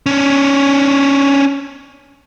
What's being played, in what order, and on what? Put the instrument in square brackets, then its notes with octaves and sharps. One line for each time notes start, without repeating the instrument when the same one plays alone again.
[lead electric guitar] C#4 D4